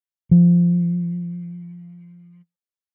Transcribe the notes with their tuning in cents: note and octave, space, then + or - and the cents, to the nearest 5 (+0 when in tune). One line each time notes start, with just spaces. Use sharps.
F3 -5